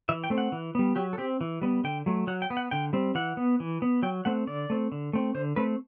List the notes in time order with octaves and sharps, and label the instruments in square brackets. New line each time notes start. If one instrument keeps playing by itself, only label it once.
[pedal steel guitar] E3 E5
G5
A3 C4
F#5
E3
G3 B3
F#3 G4
A4
C4 G4
E3
G3 B3
D3 G5
F#3 A3
F#3 F#5
G5
B3
F#5
D3 G5
G3 C4
E3 F#5
B3
E3
B3
F#3 G5
A3 C4 F#5
D3 D5
A3 C4
D3
A3 C4
D3 C5
A3 C4 B4